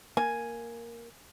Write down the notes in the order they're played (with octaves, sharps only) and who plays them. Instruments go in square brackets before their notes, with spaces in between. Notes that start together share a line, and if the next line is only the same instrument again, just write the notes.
[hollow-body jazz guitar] A#3 [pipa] G#5